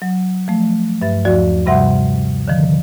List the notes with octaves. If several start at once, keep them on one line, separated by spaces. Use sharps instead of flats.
F#3
F3 A3
G2 B4 E5 A6
D#2 F3 F#4 D5
G2 C3 G3 E5 F#5 C6
D3 D#3 F3